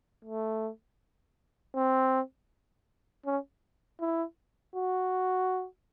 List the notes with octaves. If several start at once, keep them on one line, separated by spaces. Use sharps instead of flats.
A3
C4
C#4
E4
F#4